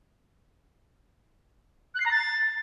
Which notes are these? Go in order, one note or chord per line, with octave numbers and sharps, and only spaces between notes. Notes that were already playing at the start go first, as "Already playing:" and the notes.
F#6
C7
A#5
A6